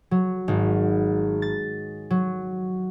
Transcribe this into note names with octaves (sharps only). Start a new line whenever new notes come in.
F#3
G#1
A6
F#3